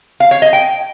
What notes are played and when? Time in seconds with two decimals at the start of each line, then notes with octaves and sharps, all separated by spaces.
0.20 F5
0.31 C#5
0.42 D#5
0.53 G5